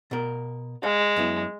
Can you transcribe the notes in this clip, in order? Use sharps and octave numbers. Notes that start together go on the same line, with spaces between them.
B2 A#4
G#3 F5
F#2 B3 E4